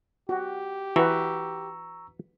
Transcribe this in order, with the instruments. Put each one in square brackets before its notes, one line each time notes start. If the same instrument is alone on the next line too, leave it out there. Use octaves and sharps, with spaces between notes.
[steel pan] F#4 [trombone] G4
[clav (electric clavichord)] E3 [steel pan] F#4 B4 [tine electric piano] A#5 C#6 E6